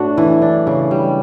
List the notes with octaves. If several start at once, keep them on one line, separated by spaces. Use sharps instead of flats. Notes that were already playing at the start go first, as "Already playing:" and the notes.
Already playing: A2 D4 F#4
E3
D4
C#3
G3